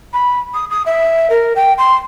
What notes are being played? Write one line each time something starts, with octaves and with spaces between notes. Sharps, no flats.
B5
D#6
D#6
E5
A#4
G5
C6